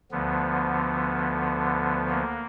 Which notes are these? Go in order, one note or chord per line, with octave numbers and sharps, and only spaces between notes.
D2 D3 F3 B3
A#3